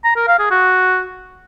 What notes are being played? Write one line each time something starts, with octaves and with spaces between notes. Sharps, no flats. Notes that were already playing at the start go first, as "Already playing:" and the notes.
A#5
A#4
F5
G#4
F#4